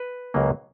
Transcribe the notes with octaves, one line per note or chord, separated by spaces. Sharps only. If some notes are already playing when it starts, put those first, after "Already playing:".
Already playing: B4
C#2 C#3 F#3 A#3